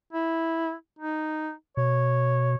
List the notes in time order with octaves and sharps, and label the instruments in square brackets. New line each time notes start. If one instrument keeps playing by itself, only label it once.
[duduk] E4
D#4
[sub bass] B2 [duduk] C#5